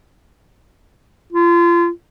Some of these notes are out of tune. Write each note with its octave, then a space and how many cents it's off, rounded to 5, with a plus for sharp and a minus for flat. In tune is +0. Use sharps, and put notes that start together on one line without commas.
F4 -30